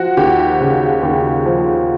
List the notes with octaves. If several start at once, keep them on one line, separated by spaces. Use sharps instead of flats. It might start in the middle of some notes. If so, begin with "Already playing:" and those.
Already playing: F3 F#4
D#2 G4
C#3
D#2
F3